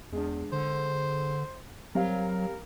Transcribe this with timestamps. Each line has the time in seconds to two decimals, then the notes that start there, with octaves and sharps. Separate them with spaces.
0.13 E2 G#3 D4
0.53 D3 C5
1.95 F#3 G3 C4 A#4 F5